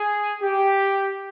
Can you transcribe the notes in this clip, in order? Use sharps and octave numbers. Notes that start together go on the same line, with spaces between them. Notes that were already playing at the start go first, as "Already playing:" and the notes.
Already playing: G#4
G4